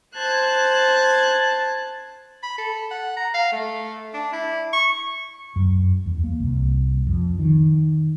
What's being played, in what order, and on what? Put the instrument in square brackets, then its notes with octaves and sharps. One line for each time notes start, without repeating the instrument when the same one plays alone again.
[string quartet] C5 F#6 G#6 [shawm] A5
[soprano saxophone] B5
A4
F#5
A#5
F5
A3
D4
E4
C#6
[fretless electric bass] F#2
E2
A#3
C2
F2
D#3